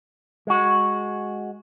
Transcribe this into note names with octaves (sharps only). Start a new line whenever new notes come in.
G#3 F#4